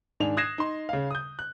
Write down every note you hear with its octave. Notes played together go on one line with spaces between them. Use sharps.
G#2 D#3 D4 G#5 F7
D#6 F#6 G#6 A#6 C7 E7
D#4 C6
C#3 F5
D#6 G6
F#6